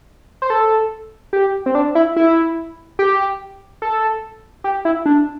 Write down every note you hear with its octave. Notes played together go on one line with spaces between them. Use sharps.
C5
A4
G4
C4
D4
E4
E4
G4
A4
G4
E4
D4